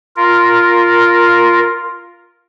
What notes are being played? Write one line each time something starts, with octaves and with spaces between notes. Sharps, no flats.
F4 A#4